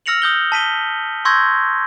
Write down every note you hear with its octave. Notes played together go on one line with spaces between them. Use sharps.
E6 F6 A#6 C#7 F7 F#7
D#6 G6 G7
A5 B6 D#7 G7
C6 C#6 E6 G6 G#6 A#6